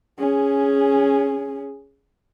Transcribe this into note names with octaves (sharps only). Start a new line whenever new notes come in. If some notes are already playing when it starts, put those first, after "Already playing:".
C#4 G#4